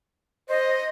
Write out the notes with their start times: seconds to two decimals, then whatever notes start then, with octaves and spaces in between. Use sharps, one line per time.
0.49 C5 D#5